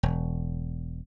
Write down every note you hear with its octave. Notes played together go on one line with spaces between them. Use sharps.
E1